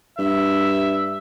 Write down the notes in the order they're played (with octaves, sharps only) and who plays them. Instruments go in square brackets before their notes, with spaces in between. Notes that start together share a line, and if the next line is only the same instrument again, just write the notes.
[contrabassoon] G2 [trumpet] E5